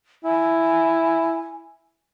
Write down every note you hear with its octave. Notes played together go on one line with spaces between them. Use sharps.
E4 G#5